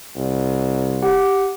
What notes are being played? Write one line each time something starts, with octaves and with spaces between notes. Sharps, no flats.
C2
G4 F#5